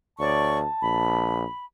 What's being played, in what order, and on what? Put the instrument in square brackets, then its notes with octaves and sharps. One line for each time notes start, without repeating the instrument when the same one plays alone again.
[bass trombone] D2 [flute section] C#5 D5 C#6 [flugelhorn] A5
[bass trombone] A#1 [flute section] B5